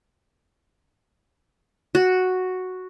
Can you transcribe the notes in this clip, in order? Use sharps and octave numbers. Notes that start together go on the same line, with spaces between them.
F#4